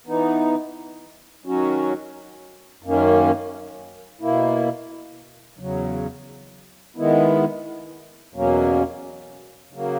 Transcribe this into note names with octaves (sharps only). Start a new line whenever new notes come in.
E3 B3 D#4
D#3 F#3 C#4 F#4
F#2 D#3 A#3 C#4
B2 A#3 E4
E2 C#3 F#3
D#3 G#3 B3 E4
E2 B2 F#3 A#3 C#4
C#3 F#3 A#3